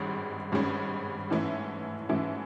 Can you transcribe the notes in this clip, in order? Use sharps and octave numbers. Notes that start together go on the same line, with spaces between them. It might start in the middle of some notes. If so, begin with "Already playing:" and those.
Already playing: G#1 G2 D#3 G#3 C#4
G#1 G2 D#3 G#3 C#4
G#2 E3 A3 C#4 E4
G#2 E3 A3 C#4 E4